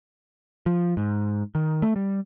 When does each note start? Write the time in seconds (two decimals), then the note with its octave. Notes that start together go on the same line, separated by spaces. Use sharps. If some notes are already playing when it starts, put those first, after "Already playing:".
0.66 F3
0.97 G#2
1.55 D#3
1.82 A3
1.96 G3